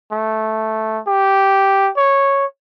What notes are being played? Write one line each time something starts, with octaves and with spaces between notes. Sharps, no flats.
A3
G4
C#5